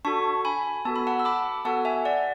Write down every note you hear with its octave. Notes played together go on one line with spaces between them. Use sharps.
D4 F#4 A4 A5 C#6
G#5 B5
B3 F#4 A4 A5
B5
F#5 A5
E6
B5 D6
B3 F#4 A4 F#5 A5
E5 G#5
D5 F#5